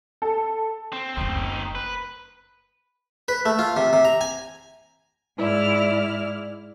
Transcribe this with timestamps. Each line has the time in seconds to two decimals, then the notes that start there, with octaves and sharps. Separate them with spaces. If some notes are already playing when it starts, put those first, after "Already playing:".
0.22 A4
0.93 C4
1.17 F#1 D2 C4 D#4
1.75 B4
3.28 B4
3.46 A3
3.59 F4
3.77 C3
3.93 C3
4.05 A#5
4.21 G#5
5.37 G#2 E4 D5 F6